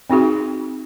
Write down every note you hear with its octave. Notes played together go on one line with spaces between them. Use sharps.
C4 D#4 F#4 G#4